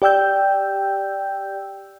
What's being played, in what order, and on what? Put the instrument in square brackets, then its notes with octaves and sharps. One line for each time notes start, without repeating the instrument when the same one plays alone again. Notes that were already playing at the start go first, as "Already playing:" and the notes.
[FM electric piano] G4 D5 G5 E6 G6